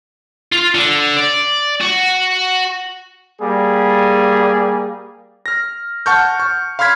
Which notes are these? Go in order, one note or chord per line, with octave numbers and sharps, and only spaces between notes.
F4
D3
D5
F#4
G3 A#3 G#4
F6 A#6
F#5 A5 C#6 F6 G6
C#6
F5 B5 C6 F6 G#6 B6